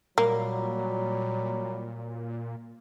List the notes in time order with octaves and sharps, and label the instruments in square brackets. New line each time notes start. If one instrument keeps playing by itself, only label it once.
[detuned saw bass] A#2 [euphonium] F#3 [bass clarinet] G3 [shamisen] A#3